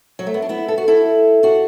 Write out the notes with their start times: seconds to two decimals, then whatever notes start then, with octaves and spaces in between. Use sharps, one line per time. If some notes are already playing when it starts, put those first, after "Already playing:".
0.19 F#3
0.27 A3
0.34 B3
0.42 D4
0.49 B3 E4
0.68 A4
0.78 F#4
0.88 E4 A4
1.43 D4 F#4